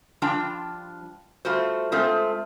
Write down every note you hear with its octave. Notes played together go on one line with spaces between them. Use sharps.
F3 G3 D4 F4 G5 A5
G3 A3 F4 F#4 C5
G#3 A3 C4 F4 C5